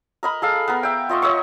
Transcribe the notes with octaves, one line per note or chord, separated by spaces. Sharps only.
A#4 D#5 B5
G#4 A4 F5
B3 A#4
E5 G5
F4 D#5 E5 C#6
C#5 D#5 E5 C#6